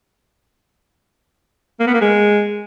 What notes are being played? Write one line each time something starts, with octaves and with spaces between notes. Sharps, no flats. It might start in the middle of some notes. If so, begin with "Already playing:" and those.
A#3
B3
A#3
G#3